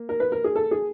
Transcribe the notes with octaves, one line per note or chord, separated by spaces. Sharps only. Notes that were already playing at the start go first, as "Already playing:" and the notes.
Already playing: A#3
A#4
B4
A#4
G#4
A4
G#4